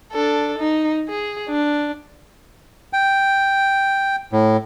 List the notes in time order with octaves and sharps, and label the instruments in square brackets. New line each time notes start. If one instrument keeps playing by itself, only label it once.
[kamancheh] D4 A4
D#4
G#4
D4
[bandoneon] G5
A2